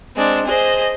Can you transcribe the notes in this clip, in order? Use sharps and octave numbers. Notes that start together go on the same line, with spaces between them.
G#3 C4 D4
G#4 C5 D#5